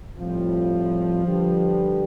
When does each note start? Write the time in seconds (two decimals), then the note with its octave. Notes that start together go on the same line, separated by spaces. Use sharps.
0.19 A2 F3 G3 C4 F4
1.25 D3 G3 D4 G4 B4